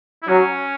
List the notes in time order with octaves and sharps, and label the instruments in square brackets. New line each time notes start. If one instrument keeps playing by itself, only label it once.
[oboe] E4
[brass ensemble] F#3 [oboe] C#4